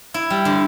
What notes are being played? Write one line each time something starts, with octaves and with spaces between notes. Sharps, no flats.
E4
G3
D3